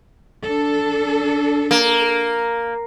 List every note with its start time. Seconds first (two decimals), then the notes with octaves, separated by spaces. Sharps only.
0.44 D4 A4
1.71 A#3